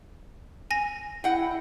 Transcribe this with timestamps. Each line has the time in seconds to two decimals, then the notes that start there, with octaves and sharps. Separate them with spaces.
0.71 G#5 A#6
1.24 E4 F#5 G5